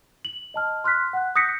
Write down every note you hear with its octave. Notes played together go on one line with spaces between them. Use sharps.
F#7
D#5 A5 F6
C6 F6 F#6 B6
F#5 F#6
D#6 F#6 G6 A#6 B6 C#7